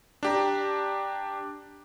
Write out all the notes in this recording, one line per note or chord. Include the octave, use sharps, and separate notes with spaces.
D4 G4 A#5